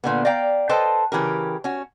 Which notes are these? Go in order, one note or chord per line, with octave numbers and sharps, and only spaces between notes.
A#2 D3 B3
D5 F5 G5 A#5
A4 B4 C5 D#5 G5 A5
C#3 E3 G4 A#4
C#4 F#4